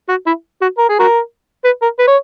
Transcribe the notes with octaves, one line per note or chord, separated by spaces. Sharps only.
F#4
E4
F#4
A#4
G#4
F#4 A#4
B4
A#4
B4
C#5